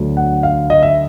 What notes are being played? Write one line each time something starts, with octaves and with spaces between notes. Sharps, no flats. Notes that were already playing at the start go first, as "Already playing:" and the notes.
Already playing: D2 D3 F#3
F#5
F5
D#5
E5